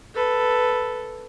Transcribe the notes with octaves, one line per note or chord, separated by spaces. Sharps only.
A4 B4